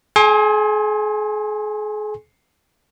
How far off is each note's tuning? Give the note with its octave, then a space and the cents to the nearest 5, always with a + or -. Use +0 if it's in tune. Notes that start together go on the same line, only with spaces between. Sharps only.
G#4 +40 G#5 -15 C6 +30